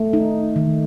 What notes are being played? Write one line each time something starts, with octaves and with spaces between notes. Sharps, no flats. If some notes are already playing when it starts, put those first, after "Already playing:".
Already playing: A3
D#4
D#3